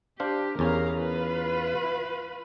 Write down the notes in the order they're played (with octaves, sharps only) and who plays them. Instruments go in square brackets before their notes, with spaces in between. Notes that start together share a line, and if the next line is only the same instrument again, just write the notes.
[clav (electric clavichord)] D4 C5 F5 [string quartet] G4
[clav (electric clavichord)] E2 C#4 G#5 [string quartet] A#4 F5 A#5
[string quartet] F4 B4 B5